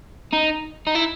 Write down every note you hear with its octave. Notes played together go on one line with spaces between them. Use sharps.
D#4
D#4
E4